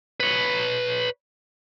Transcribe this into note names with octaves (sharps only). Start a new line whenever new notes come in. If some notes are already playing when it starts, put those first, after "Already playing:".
B4 C#5